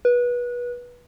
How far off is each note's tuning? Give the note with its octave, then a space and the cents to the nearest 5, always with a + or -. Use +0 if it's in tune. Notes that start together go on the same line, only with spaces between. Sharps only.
B4 -25